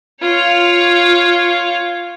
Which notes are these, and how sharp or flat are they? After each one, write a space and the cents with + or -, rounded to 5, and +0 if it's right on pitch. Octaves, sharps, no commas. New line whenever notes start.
F4 +0 C#5 +0